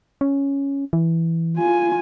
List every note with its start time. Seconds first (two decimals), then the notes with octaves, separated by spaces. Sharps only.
0.21 C#4
0.93 E3
1.57 F4 G#5